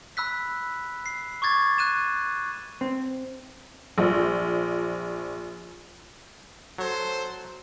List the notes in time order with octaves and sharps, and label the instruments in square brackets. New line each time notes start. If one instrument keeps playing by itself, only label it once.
[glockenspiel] B5 E6 F#6 B6
C7
C#6 D6 G#6 A6
F#6 D#7 E7
[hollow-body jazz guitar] C4
[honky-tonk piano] A#1 F3
[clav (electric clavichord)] F#3 [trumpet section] A4 C5